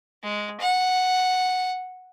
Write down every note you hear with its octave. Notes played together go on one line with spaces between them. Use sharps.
G#3
F#5